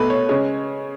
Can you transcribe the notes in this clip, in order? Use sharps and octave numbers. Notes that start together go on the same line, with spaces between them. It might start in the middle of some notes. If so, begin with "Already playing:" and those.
Already playing: B2 A3 B4
C#5
C#3 G#3 C#5